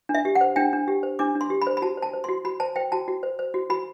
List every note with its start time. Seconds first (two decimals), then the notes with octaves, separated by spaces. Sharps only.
0.09 D4
0.14 E5
0.25 G4
0.35 F#5
0.41 C5
0.56 D4 G5
0.73 D4
0.88 G4
1.03 C5
1.19 D4 D6
1.35 D4
1.41 C6
1.50 G4
1.62 B5
1.67 C5
1.77 B5
1.82 F#4 A5
1.97 C5
2.03 A5
2.13 C5
2.24 F#4 C6
2.45 F#4 B5
2.60 C5 A5
2.76 C5 G5
2.92 F#4 A5
3.08 F#4
3.23 C5
3.39 C5
3.54 F#4
3.70 F#4 B5